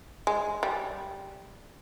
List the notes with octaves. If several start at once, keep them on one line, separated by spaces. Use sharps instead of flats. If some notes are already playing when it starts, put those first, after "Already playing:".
G#3
G3